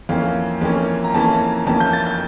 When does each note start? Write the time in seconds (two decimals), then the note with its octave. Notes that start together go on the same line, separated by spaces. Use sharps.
0.09 F2 E3 A#3 C#4 F5
0.61 F2 E3 A#3 C#4
1.04 A#5
1.14 F2 E3 A#3 C#4 A5
1.67 F2 E3 A#3 C#4 A5
1.80 G6
1.93 A6
2.06 G6